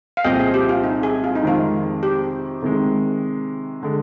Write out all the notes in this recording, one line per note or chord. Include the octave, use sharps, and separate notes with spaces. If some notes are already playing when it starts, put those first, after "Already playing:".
F5
C2 A#2 F3 C4 D#5 G5
G#4
G4
F4
D#4
G#4
F4
D#4
F2 C3 D#3 G#3 F4
G4
C3 D#3 G#3
D3 G#3